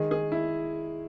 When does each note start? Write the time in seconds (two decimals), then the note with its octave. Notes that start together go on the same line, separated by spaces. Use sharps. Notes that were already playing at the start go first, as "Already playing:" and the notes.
Already playing: D#3 G#3 G#4
0.11 G#4
0.32 E4